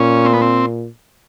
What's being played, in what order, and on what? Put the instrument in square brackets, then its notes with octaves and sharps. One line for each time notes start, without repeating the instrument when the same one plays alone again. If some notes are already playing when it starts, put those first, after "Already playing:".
Already playing: [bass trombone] A#2 [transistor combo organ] C#4
[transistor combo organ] C4
B3
C4